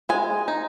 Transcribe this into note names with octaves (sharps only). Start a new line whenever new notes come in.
G#3 G#5
D#4